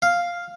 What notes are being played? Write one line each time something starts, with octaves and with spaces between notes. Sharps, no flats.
F5